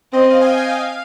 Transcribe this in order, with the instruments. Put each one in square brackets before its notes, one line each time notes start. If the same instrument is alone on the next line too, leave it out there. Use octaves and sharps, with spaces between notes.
[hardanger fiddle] C4 [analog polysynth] D#5
[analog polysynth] F5
G#5
G5
F5
G5
F5